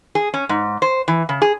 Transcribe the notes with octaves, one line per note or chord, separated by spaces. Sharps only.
G#4
C#4
G#2
C5
E3
C#3
G#4